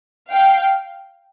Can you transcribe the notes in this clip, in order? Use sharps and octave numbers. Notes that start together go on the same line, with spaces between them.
F5 G5